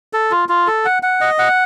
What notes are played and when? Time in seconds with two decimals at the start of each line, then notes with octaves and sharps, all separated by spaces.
0.13 A4
0.31 F4
0.49 F4
0.67 A4
0.85 F#5
1.03 F#5
1.21 D#5
1.39 F#5